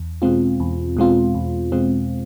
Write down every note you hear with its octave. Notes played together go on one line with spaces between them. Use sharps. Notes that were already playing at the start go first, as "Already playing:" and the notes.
Already playing: E2
B2 G#3 C4 F4
E2
B2 G#3 C4 F4
E2
B2 G#3 C4 F4